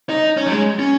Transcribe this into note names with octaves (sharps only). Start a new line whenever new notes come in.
D#4
C#4
F#3
G#3
C#4